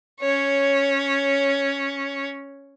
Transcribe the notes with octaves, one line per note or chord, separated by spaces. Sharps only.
C#4 C#5